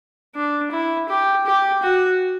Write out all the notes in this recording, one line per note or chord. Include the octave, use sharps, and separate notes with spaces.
D4
E4
G4
G4
F#4